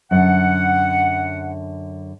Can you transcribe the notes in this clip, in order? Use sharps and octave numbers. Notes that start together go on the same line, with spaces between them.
F#2 D3 F#5